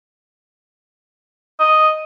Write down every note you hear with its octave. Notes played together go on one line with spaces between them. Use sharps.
D#5